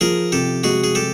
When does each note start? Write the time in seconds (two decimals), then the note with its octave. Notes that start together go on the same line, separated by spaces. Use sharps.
0.01 F3 G#4 A#4
0.32 C3 G4 A4
0.64 G#3 F#4 G#4
0.84 G#4
0.95 G4 A4